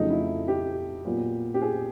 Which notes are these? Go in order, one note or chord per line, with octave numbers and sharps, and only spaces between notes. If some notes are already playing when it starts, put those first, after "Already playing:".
Already playing: F2 C#3 F#3 A3 D#4
E4
G4
A#2 F#3 B3
G4
G#4